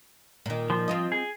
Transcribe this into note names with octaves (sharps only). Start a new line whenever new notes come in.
A#2 D#3
F3
C4 F4 D#5
G#4